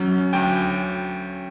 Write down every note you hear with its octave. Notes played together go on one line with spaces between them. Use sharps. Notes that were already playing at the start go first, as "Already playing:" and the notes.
Already playing: F#3 C#4
D2 G5